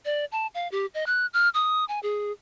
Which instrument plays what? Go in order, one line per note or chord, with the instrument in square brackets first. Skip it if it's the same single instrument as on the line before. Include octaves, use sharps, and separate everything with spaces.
[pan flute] D5
A5
F5
G4
D#5
F#6
F6
D#6
G#5
G#4